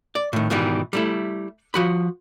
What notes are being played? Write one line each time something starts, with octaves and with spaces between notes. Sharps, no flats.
D5
A2 D#3
G#2 B2 D#3 E3 G3
G3 A3 E4
F3 F#4 B5